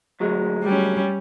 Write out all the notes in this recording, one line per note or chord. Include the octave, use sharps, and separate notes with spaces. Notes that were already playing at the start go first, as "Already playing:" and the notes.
D2 F#3 G#3
G3 C#4